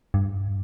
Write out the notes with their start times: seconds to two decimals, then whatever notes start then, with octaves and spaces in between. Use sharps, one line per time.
0.14 G2